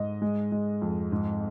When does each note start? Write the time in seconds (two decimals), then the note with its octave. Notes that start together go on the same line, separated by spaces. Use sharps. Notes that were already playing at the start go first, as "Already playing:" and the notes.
Already playing: G#2 D#5
0.22 G#3
0.52 G#3
0.82 F2
1.12 G#2